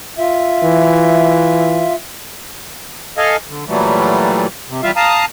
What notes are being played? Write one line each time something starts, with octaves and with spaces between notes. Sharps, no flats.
F4 E5
E3
A4 D#5 F5 G#5
D3
A#2 E3 F#3 G3 A3
C3
E2 G3 F4 E5 F5
F5 A5 A#5 D#6